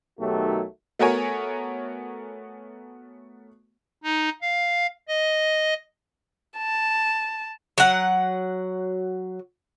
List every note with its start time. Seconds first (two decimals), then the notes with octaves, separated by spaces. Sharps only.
0.19 B1 D#3 F#3 A3 F#4 G4
0.99 A3 B3 F#4 A#4 C#5 G#5
4.04 D#4
4.42 F5
5.08 D#5
6.58 A5
7.78 F#3 F#5